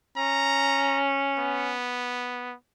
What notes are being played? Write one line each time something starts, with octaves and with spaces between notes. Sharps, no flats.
C#4 A#5
B3